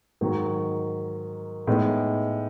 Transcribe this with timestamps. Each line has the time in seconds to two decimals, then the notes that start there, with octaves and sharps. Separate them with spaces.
0.21 G#2 D#3 F#3
1.67 A2 G#3 B3 D#4